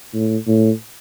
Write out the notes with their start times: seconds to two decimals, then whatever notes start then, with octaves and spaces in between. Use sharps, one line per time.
0.13 A2
0.47 A2